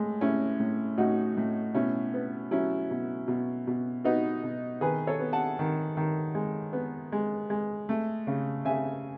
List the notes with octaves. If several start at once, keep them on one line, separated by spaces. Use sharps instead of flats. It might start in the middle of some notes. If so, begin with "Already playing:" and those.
Already playing: A2 G#3
A2 C#4 E4
A2
A2 D#4 F#4
A2
B2 C#4 E4
B3
F#3 C#4 E4
B2
B2
B2
B3 D#4 F#4
B2
D#3 G#4 B4
A4 C#5
B3
F#5 A5
D#3
D#3
G#3
B3
G#3
G#3
A3
C#3
C#3 E5 G#5